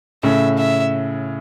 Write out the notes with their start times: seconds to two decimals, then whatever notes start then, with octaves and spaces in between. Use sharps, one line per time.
0.23 A2 C#3 E5
0.58 E5